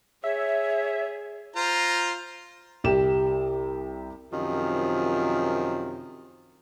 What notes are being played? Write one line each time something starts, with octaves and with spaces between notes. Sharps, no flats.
G#4 C#5 E5
F4 C5 A#5
C2 G4 E7
F#2 C3 D#3 F3 F4